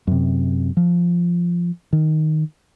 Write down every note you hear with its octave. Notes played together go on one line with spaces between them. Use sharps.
F#2 C3
F3
D#3